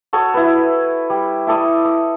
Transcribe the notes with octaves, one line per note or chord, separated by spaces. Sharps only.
F#4 A4 C#5 D#6
E4 B4
G3
E4 A4 D5 D#5
D#6